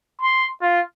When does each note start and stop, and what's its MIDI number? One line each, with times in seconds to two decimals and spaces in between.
0.21 0.48 84
0.62 0.81 65